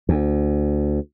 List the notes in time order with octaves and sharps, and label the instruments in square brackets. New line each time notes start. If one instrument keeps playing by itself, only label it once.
[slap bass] D2